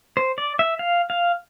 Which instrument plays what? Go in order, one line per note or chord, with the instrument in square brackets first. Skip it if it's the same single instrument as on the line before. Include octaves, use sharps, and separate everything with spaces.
[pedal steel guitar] C5
D5
E5
F5
F5